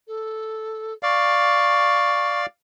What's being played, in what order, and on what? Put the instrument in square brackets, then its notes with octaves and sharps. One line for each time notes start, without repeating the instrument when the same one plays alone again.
[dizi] A4
[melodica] D5 F5 [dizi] C#6